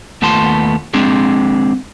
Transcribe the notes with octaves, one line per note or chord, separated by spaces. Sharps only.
D#2 A3 B3 F4 A5 C6
G#3 C4 D4 G#4